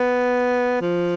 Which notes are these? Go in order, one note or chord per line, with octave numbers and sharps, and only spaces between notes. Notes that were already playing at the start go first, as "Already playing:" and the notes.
Already playing: B3
F3